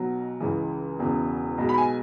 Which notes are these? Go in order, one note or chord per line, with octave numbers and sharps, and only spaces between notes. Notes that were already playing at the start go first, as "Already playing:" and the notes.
Already playing: B1 B2 F#3
C#2 C#3 E3 G#3
E1 E2 C#3
B1 B2 G#3
B5
G#5